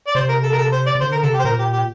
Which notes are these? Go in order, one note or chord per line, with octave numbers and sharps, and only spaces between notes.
D5
C3 C5
A#4
A4
A#4
A4
C5
D5
C3
D3 C5
A#4
C3 A4
G4
C5
A#2 A#4
G4
G4